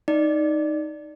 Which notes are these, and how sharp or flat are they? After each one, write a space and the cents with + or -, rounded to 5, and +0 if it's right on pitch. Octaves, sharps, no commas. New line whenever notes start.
D#4 +0 D5 +0